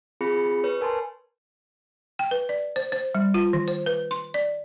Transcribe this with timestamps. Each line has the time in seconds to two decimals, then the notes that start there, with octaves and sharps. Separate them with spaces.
0.21 C4 F4 G#4 B5 C#7
0.64 B4 C#5
0.81 A#4 G#5 A5 C6
2.19 G5
2.31 B4
2.49 D5
2.76 C5
2.92 C5
3.15 G3
3.34 F4
3.53 D#3
3.68 C5
3.86 B4
4.11 C6
4.34 D5